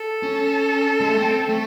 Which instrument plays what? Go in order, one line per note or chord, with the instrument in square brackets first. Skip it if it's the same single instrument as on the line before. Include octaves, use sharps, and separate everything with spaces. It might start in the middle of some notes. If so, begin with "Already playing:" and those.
Already playing: [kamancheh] A4
[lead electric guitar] C#4
G#3
A3
C4
A3